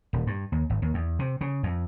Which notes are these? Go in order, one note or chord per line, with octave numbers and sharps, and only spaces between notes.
D#1
G2
D#2
G#1
D#2
E2
C3
C#3
F2